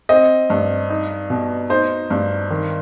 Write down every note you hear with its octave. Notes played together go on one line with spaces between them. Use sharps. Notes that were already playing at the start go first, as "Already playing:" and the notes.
C4 D#5
G2
D#4
B2
D#4 C5
G2
D#3